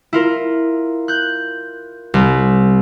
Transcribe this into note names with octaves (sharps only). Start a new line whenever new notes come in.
E4 F4 A#4
F#6 G6
C2